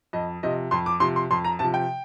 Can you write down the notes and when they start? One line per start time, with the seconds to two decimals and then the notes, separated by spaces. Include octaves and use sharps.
0.13 F2 D#5
0.43 C3 F3 D#5
0.71 F2 C6
0.86 D6
1.00 C3 F3 C6
1.16 C6
1.31 F2 C6
1.44 A#5
1.59 C3 F3 A5
1.74 G5